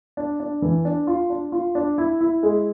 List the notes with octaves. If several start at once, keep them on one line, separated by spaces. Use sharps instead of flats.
D4
D4
E3
D4
F4
D4
F4
D4
E4
E4
G#3